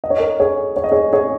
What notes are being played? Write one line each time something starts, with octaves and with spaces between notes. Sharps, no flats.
D#5
C#5
A#4 D#5
G#4 C#5
C#5
D#5
G#4 C#5
G#4 C#5